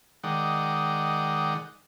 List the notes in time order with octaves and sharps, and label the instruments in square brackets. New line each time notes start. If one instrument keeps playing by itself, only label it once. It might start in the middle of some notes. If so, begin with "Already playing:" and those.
[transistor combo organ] D#3 G#3 D5 F#5 G5 D#6